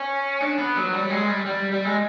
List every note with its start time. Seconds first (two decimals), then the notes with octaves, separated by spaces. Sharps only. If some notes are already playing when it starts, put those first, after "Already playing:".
Already playing: C#4
0.41 D4
0.58 B3
0.76 F#3
0.93 G3
1.10 G#3
1.28 G3
1.46 G3
1.71 G3
1.85 G#3